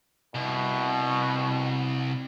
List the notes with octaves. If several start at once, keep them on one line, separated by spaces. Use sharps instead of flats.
C2 B2